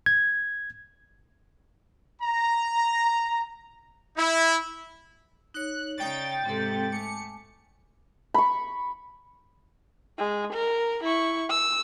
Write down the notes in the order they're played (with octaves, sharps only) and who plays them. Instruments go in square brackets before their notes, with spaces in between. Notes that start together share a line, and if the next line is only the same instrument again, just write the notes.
[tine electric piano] G#6
[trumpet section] A#5
E4
[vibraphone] D#4 C#5 [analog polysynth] F#6
[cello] C#3 D#4 [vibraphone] D5 [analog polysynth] G5 A6
[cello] G#2 C3 [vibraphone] C4 A4
[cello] A3 [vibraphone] G#5 A5 D6 [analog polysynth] C#7
[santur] B5 C#6
[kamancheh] G#3
A#4
E4 C#6
E6